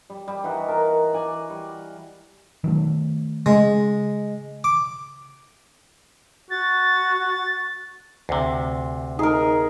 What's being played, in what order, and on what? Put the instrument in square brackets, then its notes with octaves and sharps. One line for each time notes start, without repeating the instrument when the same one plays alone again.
[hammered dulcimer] G3
G3
E3 D#4 F#4
A#4 A5
D5 G#5
G3
[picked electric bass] D#3 F#3 A3
[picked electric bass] C#3 [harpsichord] G#3
[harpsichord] D6
[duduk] F#4 [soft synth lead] A6
[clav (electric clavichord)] D2 C3
[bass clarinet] D#4 [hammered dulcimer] G#4 A#4